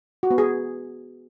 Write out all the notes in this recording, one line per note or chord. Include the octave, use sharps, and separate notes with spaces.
F#4
B3
G#4